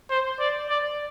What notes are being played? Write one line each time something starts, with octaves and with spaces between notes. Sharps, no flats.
C5
D5
D5